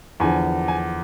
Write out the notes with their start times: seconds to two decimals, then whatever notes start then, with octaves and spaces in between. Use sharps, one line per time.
0.20 E2 D3 F3 G#5
0.68 G#5